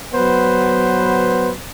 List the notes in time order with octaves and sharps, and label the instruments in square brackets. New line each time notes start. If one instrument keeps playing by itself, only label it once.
[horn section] F#3 B3 B4 C5